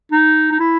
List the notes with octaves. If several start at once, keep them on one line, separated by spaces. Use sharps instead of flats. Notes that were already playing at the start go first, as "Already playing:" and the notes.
D#4
D#4
E4